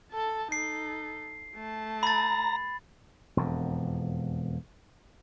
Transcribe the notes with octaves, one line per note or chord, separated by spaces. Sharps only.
A4 A5
D#4 A4 C7
A3 A5
A#5 B5 A6 A#6
E1 F2